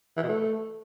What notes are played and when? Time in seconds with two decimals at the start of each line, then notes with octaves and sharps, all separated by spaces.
0.17 E3
0.23 B2
0.29 A3